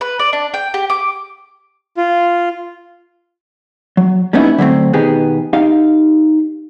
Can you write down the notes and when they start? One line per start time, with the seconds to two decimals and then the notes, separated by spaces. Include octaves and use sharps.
0.01 B4
0.19 D5
0.33 D4
0.54 G5
0.74 G4
0.90 D6
1.97 F4
3.97 F#3
4.33 G3 A#3 B3 C#4 D#4 E4
4.58 D3 F#3 A3 C4
4.93 B2 D#3 B3 G4 G#4
5.53 D#4 G4 F5